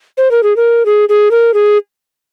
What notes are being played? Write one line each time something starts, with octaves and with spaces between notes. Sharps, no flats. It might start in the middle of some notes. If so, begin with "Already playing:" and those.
C5
A#4
G#4
A#4
G#4
G#4
A#4
G#4